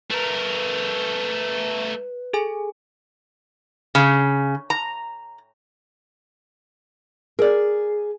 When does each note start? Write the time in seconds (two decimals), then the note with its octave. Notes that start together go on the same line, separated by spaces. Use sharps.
0.10 A3 A#4 B4
2.33 G#4 A4 G#5
3.95 C#3
4.70 A#5
7.39 G#4 A#4 D5